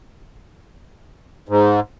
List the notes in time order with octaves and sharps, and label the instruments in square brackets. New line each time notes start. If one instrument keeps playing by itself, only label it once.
[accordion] G#2